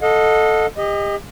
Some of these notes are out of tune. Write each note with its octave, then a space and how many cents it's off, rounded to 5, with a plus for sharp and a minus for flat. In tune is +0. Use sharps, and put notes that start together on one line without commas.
A4 +0 D#5 +0 F#5 -45
G4 +35 D#5 +0